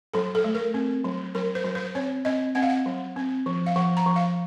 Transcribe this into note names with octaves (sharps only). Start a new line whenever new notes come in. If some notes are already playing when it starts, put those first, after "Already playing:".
F#3 A4
A4
A3
A#4
C4
F#3
F#3 A#4
C5
F#3
C5
C4 C#5
C4 D#5
C4 F#5
F5
F#5
F#3
C4
F3
F5
F3 F#5
A#5
F3
F5